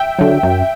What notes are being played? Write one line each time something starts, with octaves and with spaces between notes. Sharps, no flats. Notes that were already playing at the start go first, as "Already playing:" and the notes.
Already playing: E5 G5
D3 F#3
F#2